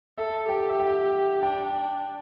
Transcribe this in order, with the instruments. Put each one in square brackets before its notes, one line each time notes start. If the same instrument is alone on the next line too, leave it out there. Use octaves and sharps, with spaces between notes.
[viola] A4 [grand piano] E5
[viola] G4 [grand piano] G5
[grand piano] E5
G5
[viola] D4 [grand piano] G5